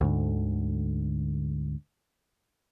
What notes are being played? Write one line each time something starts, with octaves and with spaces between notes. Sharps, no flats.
D2 G#2 D3